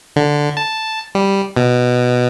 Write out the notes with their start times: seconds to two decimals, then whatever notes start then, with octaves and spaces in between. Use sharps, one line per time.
0.16 D3
0.57 A5
1.15 G3
1.56 B2